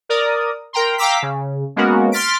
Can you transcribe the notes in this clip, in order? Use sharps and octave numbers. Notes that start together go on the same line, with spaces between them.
A#4 D5 D#6
A#4 G5 A#5 C6
F5 G5 A#5 D6 E6 B6
C#3
G#3 A#3 B3 C#4 F#4 A#4
C6 F6 A6 B6 D7